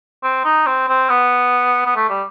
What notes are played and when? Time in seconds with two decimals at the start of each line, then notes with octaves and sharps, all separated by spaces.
0.23 C4
0.45 D#4
0.67 C4
0.89 C4
1.10 B3
1.86 B3
1.96 A3
2.09 G3